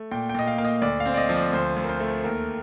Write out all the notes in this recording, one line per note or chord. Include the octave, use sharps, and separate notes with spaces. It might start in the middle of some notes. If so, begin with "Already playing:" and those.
Already playing: A3
A#2 G5
G5
A#2 D#5
F5
A#3 F5
D#5
D2 D5
F5
C4
D5
D#5
F3
D5
D2 C5
D2
A#4
C5
A3
D#2 A#4